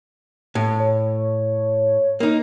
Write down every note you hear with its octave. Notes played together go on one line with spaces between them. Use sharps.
A2
C#5
A#3 D#4